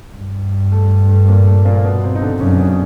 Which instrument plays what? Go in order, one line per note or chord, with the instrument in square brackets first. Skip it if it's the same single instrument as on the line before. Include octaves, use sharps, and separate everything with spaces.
[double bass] G2
[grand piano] A3
A3
A#2 A#3
A3
A#2 A#3
A#3
B2 B3
C3 C4
D#4
D3 D4
[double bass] F#2 [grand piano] C#3 C#4
[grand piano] C#3 C#4